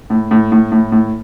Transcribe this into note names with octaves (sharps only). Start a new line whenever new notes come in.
A2
A2
A2
A2
A2